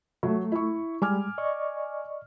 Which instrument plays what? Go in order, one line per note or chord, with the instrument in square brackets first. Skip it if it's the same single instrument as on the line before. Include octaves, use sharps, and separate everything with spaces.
[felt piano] F#3 [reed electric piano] A3
[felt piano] E4 C#6
[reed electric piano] G3 G#3 [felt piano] G#5 D6 F6
[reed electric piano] D5 D#5 C#6